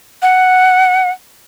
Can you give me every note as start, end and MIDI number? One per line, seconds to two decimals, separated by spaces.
0.22 1.10 78